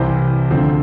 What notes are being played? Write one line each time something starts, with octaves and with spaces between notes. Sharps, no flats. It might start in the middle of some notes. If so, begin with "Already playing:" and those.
Already playing: C2 C3 E3 C5
D2 D3 F3 C4